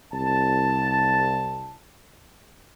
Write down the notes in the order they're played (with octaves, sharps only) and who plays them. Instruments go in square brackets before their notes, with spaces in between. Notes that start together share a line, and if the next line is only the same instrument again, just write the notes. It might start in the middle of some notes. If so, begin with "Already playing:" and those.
[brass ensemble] C2 A5